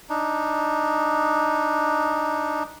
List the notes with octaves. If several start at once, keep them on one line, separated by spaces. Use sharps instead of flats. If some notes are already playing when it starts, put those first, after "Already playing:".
D4 D#4